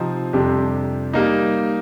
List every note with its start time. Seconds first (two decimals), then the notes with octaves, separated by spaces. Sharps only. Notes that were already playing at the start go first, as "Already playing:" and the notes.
Already playing: C3 F3 C4 D#4
0.33 F2 C3 G3 D4 G4
1.13 G3 A#3 D#4